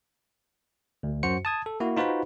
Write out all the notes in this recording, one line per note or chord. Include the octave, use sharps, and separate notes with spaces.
D2
F#2 F#4 C5 C#7
A5 D#6 G#6
A4
A#3 E4 F#4
D#4 F4 F#4 B4 C5 B5